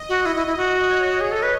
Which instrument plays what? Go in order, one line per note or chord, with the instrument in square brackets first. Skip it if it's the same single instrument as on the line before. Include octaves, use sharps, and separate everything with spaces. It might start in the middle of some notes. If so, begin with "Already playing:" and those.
Already playing: [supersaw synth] D#5
[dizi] F#4
[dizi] E4 [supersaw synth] D#5
[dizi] E4
E4
F#4
[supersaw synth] C#5
[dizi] G#4
A4
B4